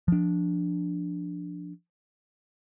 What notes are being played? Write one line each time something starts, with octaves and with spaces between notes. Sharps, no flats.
F3 D4